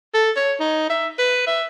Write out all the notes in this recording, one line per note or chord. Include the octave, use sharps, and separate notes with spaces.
A4
C#5
D#4
E5
B4
E5